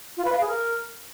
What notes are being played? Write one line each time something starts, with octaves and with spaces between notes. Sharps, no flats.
F4
B4
F5
G#4
A#4